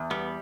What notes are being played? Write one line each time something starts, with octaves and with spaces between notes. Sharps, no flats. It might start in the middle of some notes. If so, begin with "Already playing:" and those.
Already playing: E2
G3 B3